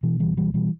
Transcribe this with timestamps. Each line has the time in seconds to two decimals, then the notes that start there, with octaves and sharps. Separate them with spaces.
0.03 B2 E3
0.20 C#2 E3 G3
0.37 B2 E3 G3
0.54 B2 E3 G3